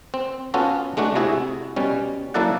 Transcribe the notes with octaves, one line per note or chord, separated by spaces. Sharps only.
C4
B3 C#4 F4 F#4 A4
G#3 A3 D4 F#4
C3 E4 F#4 G#4
B2 G3 C#4
F#3 A#3 E4 A4 D5 F#5